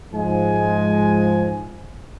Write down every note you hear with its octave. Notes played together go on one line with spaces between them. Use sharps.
G#2 F3 G#3 G#5